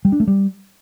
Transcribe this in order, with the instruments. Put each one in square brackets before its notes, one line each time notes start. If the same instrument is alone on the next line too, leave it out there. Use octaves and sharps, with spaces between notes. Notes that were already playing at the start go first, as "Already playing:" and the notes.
[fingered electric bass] G3
D4
A3
G3